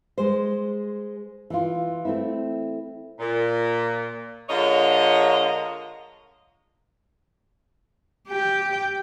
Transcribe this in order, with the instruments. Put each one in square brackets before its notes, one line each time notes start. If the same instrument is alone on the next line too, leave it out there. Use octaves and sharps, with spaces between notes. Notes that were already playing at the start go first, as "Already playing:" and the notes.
[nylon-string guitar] G#3 C5
E3 F4
A3 C4 E4
[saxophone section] A#2
D3 G#3 F4 A#4 C#5 D#5
[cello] G4 G5